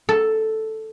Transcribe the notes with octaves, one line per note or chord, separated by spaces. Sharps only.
A4